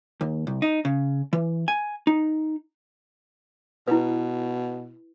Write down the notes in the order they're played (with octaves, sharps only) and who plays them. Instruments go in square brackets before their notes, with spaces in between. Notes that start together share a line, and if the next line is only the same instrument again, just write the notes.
[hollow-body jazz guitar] D#2
C2
D#4
C#3
E3
G#5
D#4
[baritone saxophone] B2 [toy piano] E4 B4